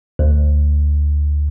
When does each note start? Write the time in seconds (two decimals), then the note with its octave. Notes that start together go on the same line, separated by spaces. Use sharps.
0.19 D2